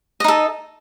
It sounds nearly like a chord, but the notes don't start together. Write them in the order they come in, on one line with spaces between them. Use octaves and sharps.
D#5 D#4 A4